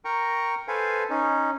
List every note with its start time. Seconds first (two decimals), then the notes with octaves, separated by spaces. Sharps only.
0.05 A#4 G5 A#5 C#6
0.68 A4 B4 C5 F5 G#5
1.10 C#4 D#4